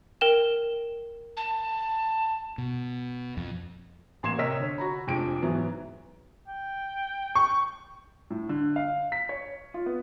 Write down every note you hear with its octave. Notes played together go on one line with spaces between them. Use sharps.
A#4 G5 E7
A5
B2
F2
A1 A#3 C6 G#6 C7 E7
C3 A#4 C#5 D#5 E6 B6
D3 C#5
F#4 A#5 B5
F1 F2 G#3 D4 D7
G#2 E3 F#3 B3
G5
C#6
A2
D3
F5
B6
C#5
F4
B3